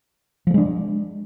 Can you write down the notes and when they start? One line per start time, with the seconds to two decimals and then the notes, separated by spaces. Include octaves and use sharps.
0.47 F3
0.50 A3
0.54 G#3
0.58 D4